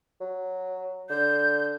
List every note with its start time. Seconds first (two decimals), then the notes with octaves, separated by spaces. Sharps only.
0.21 F#3
1.10 D3 G6